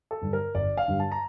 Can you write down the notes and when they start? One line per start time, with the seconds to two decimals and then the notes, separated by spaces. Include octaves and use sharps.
0.11 A4
0.21 G2 D3 G3
0.33 A#4
0.54 G1 D5
0.77 F5
0.88 G2 D3 G3
1.00 A5
1.12 A#5